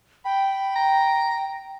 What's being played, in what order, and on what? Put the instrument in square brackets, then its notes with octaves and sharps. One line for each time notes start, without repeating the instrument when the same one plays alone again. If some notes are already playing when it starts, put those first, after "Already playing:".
[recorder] G5 [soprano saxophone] B5
[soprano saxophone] A#5